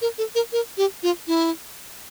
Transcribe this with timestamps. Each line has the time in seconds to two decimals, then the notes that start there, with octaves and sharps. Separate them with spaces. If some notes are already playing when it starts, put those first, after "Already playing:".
0.02 A#4
0.18 A4
0.35 A#4
0.52 A#4
0.77 G4
1.03 F4
1.27 E4